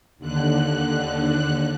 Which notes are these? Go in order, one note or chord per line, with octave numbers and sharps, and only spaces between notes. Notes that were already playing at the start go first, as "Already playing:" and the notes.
D#2 D3 F#6